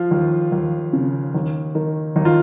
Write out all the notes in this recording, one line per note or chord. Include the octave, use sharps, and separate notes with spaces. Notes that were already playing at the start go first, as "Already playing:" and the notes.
Already playing: F3 F4
D#2
D#2
C#3
D#2
D#3
D#2 D#4
F4